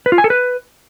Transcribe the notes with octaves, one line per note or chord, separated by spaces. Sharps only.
B4
F4
G#5
A4
B4